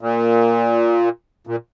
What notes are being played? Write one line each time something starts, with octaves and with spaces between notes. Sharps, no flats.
A#2
A#2